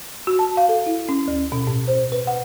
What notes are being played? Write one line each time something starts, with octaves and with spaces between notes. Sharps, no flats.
F#4
A5
F5
A4
E4
C#4
D2
B2
A2
C5
B4
F#5